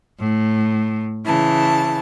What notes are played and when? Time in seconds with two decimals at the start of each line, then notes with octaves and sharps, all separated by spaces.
0.19 A2
1.25 C#3 E3 A5